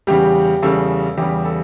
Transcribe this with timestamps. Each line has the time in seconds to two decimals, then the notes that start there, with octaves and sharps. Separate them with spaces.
0.07 E2 C#3 G3 G4
0.63 E2 C#3 G3 A4
1.18 E2 C#3 G3 G4
1.45 A4